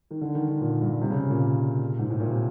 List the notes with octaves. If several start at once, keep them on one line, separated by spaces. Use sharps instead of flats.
D#3
D3
D#3
D3
A#2
G2
C3
C#3
C3
A#2
G#2
A2
A#2
C3